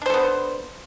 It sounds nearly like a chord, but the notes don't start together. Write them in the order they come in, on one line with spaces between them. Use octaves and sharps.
D4 C5 A4 B3